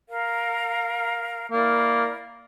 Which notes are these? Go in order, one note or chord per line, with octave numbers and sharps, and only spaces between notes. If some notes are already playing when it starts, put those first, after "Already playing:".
A#4 F5
A#3 E4 A#4 D5